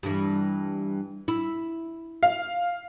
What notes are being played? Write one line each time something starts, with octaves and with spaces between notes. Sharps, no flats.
G2 E3
E4
F5